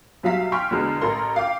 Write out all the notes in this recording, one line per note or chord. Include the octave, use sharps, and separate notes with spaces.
B1 F#3 G3 E5 F5 B6
G5 G#5 C6 C#6 F6 B6
E2 B2 D3 G#3
A1 A4 A#4 C6
F5 G5 D6